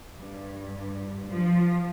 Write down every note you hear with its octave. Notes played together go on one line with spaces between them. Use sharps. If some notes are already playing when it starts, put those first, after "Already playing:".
G2
F3